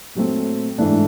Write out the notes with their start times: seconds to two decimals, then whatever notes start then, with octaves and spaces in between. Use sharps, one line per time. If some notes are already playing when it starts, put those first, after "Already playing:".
0.15 A#2 F#3 A3 C4
0.78 G#2 E3 A3 D4